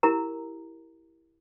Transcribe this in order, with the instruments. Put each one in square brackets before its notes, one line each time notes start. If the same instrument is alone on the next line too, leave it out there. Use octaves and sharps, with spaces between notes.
[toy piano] E4 G4 A#4 A#5